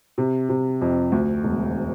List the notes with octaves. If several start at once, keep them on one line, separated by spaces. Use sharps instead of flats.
C3
C3
F2
D2
E1